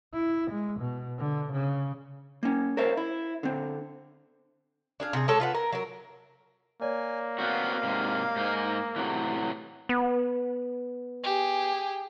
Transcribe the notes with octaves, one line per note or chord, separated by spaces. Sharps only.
E4
G#3
B2
D3
C#3
A#3 C#4
A#4 C5 C#5 E5 F5
E4
D3 C4
D4 G#4 F5
C3 G#4
G#3 G4 A4 C#5
F4 B4 F#5
A#4
F#3 A#4
A#3 C#5 D5 G#5
B3 C4 F#4 F5
G#2 C3
G#2 D#4
A2 C3 E3 F#3
B3
G4 G#4